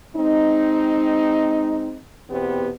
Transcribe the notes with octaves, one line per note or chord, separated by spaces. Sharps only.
G#3 C4 D#4
E2 B2 B3 C4 G4